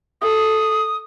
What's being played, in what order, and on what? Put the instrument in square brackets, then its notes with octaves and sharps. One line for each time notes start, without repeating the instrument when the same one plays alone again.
[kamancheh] A4 [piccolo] D#6